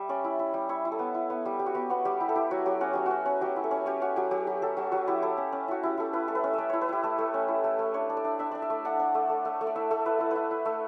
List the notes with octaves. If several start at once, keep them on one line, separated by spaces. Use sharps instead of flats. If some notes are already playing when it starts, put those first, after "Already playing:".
Already playing: G3 E5
C#4 D5
E4
E4
G3
E4 C#5
E4
A4
B3
E4
B3
G3
G3
F#4
B3 G4
B3 F#4
G3 G4
E4 G4
A4
E4 G4
F#3 F#4
F#3 G4
C#4 F#4
F#3 G4
C#4 F#4
C#4
F#3 G4
E4
A4
C#4
C#4 G4
C#4 F#4
F#3 G4
F#3 G4
F#3 G4
F#3 A4
F#3 G4
F#3 F#4
E4 G4
E4 A4
C#4
C#4
E4 F#4
E4 G4
E4 A4
E4 B4
A3 A4
B4
C#4
A3 D5 E5
E4 C#5
B4
E4 G4
A3 A4
A3
C#4
E4
A3
A3
D4 C#5
D4
D5
D4
D4 E5
D4 D5
E5
A3
D4 F#5
D4
A3
A3
A3
A3
D5
E4 E5
A3 A4
E4 B4
E4 A4
E4 B4
E4
A3